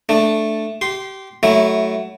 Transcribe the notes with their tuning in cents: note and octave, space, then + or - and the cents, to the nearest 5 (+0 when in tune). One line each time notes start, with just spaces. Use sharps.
A3 +0 D4 +5
G4 -25 C6 +0
F#3 +20 A3 +0 E4 -10